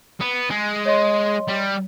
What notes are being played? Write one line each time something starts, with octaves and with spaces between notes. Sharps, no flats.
B3
G#3
C#5 D#5 C6
G3